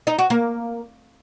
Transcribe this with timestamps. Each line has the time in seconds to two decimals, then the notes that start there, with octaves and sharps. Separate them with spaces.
0.07 D#4
0.19 F#4
0.30 A#3